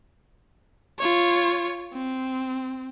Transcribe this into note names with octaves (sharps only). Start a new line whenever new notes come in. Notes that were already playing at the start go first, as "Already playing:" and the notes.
F4 C#5
C4